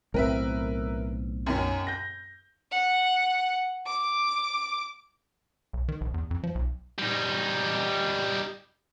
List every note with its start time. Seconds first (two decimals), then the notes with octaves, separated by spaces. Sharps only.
0.14 B1 A2 C4 A#4 B4 E5
1.46 F#2 D#3 C#4
1.87 G6 A#6
2.71 F#5
3.87 D6
5.73 B1
5.88 D#3
6.01 A#1
6.14 E2
6.31 F2
6.43 F3
6.55 B1
6.98 G3 D#4